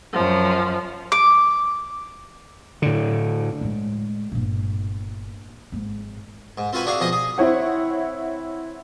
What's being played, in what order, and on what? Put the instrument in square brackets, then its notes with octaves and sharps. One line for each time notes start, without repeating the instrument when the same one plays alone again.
[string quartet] F#2 F3
[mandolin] D6
[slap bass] A2 D3
[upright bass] A2 G#3
G1 A#2
G#1 G#2
[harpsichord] G#2
C4 F4 F#4 B4 G#5 B5
D4 F#4 G#4 E5 F5
B2 F3 G#4 D#5 D#6
G#4
[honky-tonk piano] C4 E4 C#5 F#5